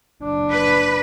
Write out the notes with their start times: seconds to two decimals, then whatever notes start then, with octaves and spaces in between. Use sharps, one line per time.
0.22 F#1 D4
0.52 B4